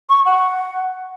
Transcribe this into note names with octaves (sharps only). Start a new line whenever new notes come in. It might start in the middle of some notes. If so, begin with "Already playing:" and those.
C#6
F#5